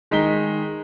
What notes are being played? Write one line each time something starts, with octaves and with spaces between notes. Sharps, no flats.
D#3 G#3 D#4 B6 G7